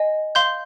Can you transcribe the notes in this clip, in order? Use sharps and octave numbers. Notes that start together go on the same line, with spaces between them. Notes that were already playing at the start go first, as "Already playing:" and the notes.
Already playing: D#5 G#5
F5 C6 G6